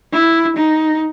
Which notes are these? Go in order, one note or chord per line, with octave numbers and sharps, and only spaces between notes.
E4
D#4